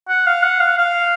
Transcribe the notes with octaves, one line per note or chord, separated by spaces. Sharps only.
F#5
F5
F#5
F5
F5